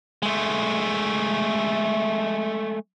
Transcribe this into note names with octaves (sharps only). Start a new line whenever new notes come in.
G#3 A3